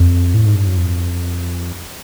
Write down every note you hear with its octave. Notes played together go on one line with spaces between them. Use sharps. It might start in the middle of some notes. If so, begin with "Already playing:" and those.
Already playing: F2
A2
G#2
G2
F#2
F2